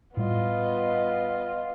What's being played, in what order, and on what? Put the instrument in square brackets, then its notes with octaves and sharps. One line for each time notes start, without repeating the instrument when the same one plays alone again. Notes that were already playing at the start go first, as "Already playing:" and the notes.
[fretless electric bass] A2 G3 [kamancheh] B3 D#5 [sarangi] F4